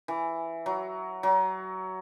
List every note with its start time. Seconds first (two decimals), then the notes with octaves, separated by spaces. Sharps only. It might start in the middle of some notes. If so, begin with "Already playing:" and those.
0.08 E3
0.66 F#3
1.23 F#3